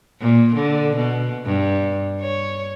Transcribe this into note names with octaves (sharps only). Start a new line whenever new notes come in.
A#2
D3
B2
G2
C#5